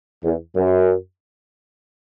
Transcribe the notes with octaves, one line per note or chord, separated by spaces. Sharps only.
E2
F#2